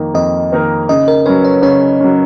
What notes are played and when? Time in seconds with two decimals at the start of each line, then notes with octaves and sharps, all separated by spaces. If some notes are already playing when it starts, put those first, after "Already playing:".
Already playing: F2 D#3 A#3 D#4 A#4
0.14 F2 D#5
0.52 D#3 A#3 D#4 A#4
0.89 C#3 D#5
1.08 A#4
1.26 F#3 C#4 B4
1.44 C#5
1.62 C#3 C#5
2.00 F#3 C#4